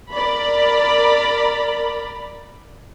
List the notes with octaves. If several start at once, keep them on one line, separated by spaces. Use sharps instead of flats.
A#4 D5 A#5 B5